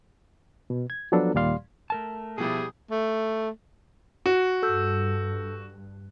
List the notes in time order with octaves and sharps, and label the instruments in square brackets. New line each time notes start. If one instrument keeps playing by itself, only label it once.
[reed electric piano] B2
G#6
F3 F#3 B3 D4 A4
D#2 A#2 G3 D5 F5 C6
[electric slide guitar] A3 A#4 A5
[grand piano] B2 F3 E4 [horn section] G3 G4 G#4
[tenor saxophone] A3
[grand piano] F#4
[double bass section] G2 [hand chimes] A4 E6 G6